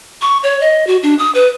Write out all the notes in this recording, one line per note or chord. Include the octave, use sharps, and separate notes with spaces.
C#6
C#5
D#5
F#4
D4
D#6
B4